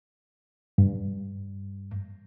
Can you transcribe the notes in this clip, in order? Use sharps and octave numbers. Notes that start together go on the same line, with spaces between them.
G2